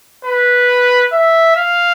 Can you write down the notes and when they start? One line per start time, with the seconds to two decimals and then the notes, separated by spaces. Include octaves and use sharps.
0.25 B4
1.12 E5
1.57 F5